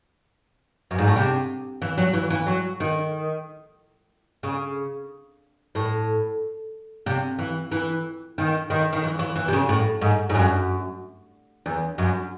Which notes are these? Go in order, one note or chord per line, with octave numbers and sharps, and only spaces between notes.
F#2
G#2
A2
C3
E3
F#3
E3
E3
F#3
D#3
C#3
A2
C3
E3
E3
D#3
D#3
D#3
E3
E3
E3
C3
C#3
A2
G#2
G#2
F#2
E2
F#2